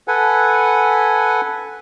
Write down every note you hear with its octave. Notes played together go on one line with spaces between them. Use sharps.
A4 B4 F#5 G#5